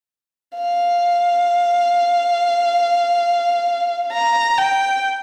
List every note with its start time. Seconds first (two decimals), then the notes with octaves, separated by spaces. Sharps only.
0.57 F5
4.13 A#5
4.58 G5